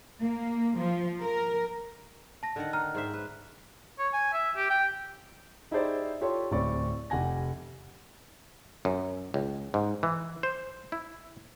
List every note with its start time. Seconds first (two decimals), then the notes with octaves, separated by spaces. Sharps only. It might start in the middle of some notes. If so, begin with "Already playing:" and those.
0.22 A#3
0.78 F3
1.23 A#4
2.43 A5 A#6
2.56 D3 D#3 F#5
2.73 G5 A#5 F6
2.95 G#2 C5 E5
3.14 B4
3.99 C#5
4.13 G#5
4.33 E5
4.57 G4
4.70 G5
5.71 D#4 E4 G4 G#4 C5 D5
6.21 F4 G4 A4 C#5 C6
6.51 D1 A2 C4 D5 C#6
7.10 F1 G4 F#5 G#5 A#6
8.85 F#2
9.34 C#2
9.74 G#2
10.03 E3
10.43 C5
10.92 E4